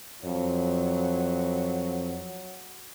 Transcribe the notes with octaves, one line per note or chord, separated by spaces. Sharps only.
F2 F#3